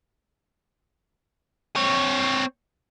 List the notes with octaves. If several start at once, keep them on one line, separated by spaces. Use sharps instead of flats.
C4 C#5